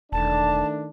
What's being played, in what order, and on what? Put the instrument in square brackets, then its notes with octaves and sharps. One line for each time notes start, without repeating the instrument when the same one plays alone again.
[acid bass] E1 [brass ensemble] D#3 A3 D4 [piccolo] A5